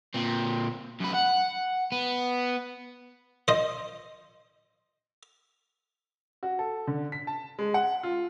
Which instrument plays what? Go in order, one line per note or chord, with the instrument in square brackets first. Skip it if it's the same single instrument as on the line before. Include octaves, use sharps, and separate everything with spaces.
[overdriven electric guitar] A#2 C4
F#2 B4
F#5
B3
[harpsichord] C5 D#5
[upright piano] F#4
A4
D3
B6
A5
G#3
F#5
F4